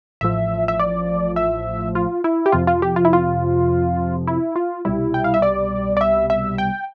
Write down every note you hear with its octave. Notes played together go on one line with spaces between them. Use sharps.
A1 A2 F3 E5
E5
D5
E5
F4
E4
G4
F2 C3 F3 F4
F4
G4
F4
E4
F4
E4
F4
C2 B2 G3 E4
G5
F5
E5
D5
D5
E5
E5
G5